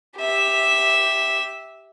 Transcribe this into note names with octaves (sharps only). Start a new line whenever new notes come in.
G4 E5